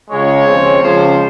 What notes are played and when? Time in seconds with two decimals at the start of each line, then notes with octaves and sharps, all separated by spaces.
0.11 C#2 C#3 G#3 C#5
0.46 D#2 C#3 F3 C4
0.81 C#2 C#3 F3 C5